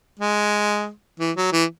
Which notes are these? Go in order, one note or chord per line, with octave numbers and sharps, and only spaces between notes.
G#3
E3
F#3
E3